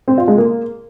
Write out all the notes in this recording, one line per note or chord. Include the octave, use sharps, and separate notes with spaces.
C4
F4
G#3
A#3